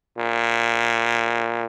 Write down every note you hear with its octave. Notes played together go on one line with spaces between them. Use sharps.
A#2